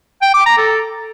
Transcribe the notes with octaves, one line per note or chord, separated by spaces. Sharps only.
G5
D6
A#5
A4